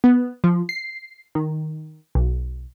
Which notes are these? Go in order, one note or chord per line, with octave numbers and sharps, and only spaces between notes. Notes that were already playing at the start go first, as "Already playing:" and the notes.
B3
F3
C7
D#3
B1